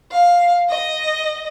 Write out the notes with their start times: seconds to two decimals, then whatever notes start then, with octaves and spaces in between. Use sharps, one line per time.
0.11 F5
0.69 D#5